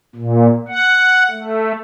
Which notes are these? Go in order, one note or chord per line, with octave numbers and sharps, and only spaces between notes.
A#2
F#5
A3